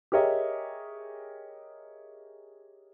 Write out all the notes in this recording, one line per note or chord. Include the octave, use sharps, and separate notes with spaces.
G4 G#4 A#4 C#5 D#5 E5